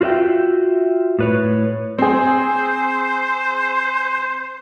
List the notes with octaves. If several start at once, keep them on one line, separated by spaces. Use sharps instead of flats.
F4 F#4 B4 E5 G5
A2 B4 C#5
C4 G#4 C5